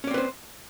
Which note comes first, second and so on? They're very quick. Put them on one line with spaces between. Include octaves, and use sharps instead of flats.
C#4 D5 C4 B4 C5